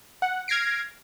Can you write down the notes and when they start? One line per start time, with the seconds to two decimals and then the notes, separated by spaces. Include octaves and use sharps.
0.22 F#5
0.48 F6 G#6 A#6 C7 D7